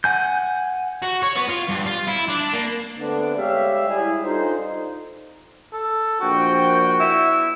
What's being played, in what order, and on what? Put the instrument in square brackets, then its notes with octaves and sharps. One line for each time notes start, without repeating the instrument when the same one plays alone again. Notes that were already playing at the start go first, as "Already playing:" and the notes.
[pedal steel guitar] F#5 G#5 G6
[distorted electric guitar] F#4
C#5
B3
F4
G2
F4
E4
D4
A#3
[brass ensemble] D3 A3 B3 C4 D4
G3 G#3 G4 C#5 E5 F5
G3 E4 G#4
D4 D#4 F4 A4 C5
[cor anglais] A4
[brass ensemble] A#1 G5 [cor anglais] F#4
[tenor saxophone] E4